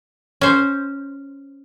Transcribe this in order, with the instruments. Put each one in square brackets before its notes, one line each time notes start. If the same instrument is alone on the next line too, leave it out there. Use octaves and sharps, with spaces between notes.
[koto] C#4 C5